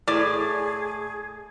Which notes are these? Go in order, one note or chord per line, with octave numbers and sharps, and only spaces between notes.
A2 G#4 D5